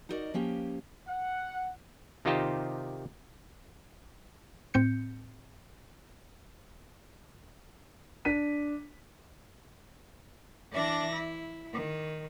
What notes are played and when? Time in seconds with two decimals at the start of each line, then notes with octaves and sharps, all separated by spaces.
0.09 D#4 E4 F#4 A#4 D5 D#5
0.34 F3 A#3 C#4 G4
1.07 F#5
2.25 C3 D#3 D#4 F4 G4 C5
4.74 A2 C4 G6 C#7
8.25 D4 B6 D#7
10.73 E3 D4 D5 E5 A#6
11.13 E4
11.72 D#3